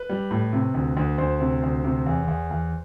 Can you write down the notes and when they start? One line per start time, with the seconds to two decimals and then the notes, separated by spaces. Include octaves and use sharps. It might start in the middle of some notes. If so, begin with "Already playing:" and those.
Already playing: B4
0.09 G3
0.31 A2
0.53 C3
0.74 D2
0.97 D2
1.18 D2 C5
1.40 C3
1.63 D2
1.84 C3
2.06 E2
2.28 E2
2.51 E2